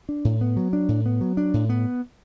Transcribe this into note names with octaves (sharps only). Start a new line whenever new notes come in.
D4
A2
B3
F#3
D4
A2
B3
F#3
D4
A2
B3